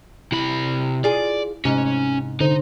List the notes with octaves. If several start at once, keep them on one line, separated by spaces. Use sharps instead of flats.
C3 E4 B5
F4 G#4 D5
G#2 C3 C#4
D3 D#4 C5